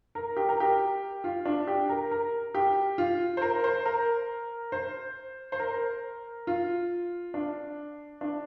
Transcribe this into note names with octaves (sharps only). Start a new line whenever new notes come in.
A#4
G4
A#4
G4
F4
D4
G4
A#4
A#4
G4
F4
C5
A#4
C5
A#4
C5
C5
A#4
F4
D4
D4